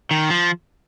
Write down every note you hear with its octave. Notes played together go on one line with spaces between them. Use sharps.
D#3
F3